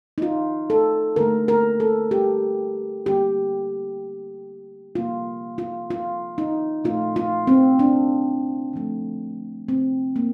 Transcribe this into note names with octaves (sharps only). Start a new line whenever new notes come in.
D#4
F4
A4
D3 A3 A#4
A#4
A4
G4
D3 G3 A#3 G4
C3 G3 A#3 F4
F4
F4
D#4
A#2 A3 F4
F4
C4
D4
D3 F3 A3
C4
A#3